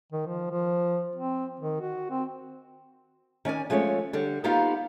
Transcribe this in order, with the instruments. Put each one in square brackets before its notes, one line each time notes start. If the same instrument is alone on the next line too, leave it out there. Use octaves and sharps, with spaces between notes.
[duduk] D#3
F3
F3
C4
D#3
F#4
C4
[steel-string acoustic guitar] D#3 C#4 D5 G#5
F3 G#3 A3 C#4 C#5
D3 G3
A#3 B3 D#4 F4 G4 F5